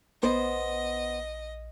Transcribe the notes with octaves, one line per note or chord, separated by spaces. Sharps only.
A#1 B3 C5 D#5